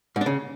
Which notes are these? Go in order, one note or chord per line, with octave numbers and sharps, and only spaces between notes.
G#2
D4
C#3